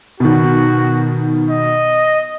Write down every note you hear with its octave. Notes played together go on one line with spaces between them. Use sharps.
B2 D#3 F#4
D#5